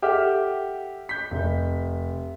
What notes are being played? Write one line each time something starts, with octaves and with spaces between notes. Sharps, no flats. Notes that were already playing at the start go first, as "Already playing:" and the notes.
G4 A4 E5 F#5 D6 F6
G6 B6
F1